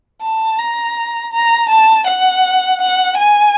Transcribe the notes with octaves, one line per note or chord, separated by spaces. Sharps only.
A5
A#5
A#5
A5
F#5
F#5
G#5